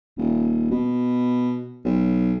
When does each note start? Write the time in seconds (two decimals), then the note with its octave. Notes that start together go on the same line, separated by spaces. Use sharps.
0.17 D#1
0.70 B2
1.85 B1